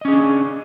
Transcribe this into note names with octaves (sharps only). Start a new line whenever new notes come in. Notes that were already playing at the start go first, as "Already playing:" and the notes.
C#4 D4 G#4 D#5